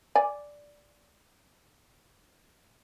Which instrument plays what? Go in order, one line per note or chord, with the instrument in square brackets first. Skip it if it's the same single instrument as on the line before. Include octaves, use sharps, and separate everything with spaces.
[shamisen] D5 G#5